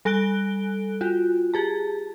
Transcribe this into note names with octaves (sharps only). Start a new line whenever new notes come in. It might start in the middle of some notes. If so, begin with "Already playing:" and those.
G3 A4 G#5 F#6 D7 G7
F4 F#4
G4 G#4 A5